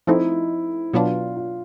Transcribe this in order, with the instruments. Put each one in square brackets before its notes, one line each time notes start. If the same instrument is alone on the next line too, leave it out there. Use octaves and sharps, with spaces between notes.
[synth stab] F3 A3 C4 D#4 [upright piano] E4
[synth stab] B2 F#3 B3 D4 [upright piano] F4
[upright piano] F4